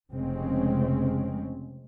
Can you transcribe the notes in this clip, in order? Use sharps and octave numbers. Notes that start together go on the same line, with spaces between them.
F1 C#3 G#3 C4 C#4